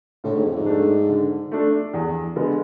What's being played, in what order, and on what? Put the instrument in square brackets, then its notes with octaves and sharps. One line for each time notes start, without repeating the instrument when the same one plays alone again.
[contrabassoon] A2 [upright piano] D3
[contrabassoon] G#2
F2
G#2
[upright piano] A3 D4
D3
A3 D4
E2
D3 G#3 B3